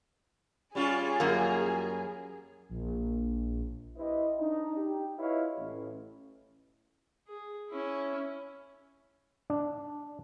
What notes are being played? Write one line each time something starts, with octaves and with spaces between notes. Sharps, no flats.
G3 C#4 F4 G#4
F#2 A#3
A#1
E4 G4 B4 C5 D#5
D4 D#4
G4
E4 F4 B4 C#5 D#5 F5
A1
G#4
C#4 E4
D4